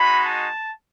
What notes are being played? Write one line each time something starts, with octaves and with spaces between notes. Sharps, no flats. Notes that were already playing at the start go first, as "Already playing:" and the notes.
Already playing: G#3 D#4 F#4 B5
A5